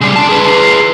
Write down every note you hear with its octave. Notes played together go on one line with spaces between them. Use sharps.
C#3 G3 C6
D4 A5
G#4 B4